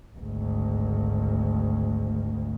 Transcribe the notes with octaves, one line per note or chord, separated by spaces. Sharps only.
G#1 D2